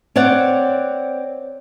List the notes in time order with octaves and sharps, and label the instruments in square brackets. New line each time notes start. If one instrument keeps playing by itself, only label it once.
[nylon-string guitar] C4 C#5 D5 F#5